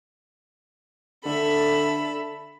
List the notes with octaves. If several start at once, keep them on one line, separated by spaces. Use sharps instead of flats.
D3 A4 E5 B5